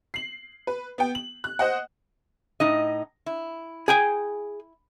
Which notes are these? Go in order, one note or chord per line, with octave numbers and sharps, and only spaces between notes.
C7 F#7
B4
B3 G5
F#7
F#6
C5 D#5 F#5
A2 D#4 D#5
E4
G#4 G5 G#5